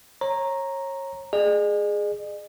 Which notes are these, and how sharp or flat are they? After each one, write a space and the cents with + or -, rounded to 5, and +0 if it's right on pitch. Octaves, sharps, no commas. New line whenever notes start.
C#5 -30 A#5 +0
G#4 +0 D#5 -45